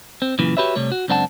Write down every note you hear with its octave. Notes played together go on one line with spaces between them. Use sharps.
C4
F#2 A#2 C#3 E3
F#4 G4 B4 C#5 E5
C3 G3 A3 C#5
F#4
C#2 F#2 C4 D4 F#5 A5